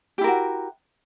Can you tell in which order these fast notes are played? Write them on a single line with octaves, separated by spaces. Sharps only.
G4 E4 A#4 F#4